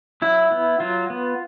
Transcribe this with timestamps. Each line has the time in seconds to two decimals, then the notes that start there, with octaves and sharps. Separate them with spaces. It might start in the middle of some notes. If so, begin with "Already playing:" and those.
0.22 F#3 E4
0.52 B3
0.80 F#3 F4
1.10 B3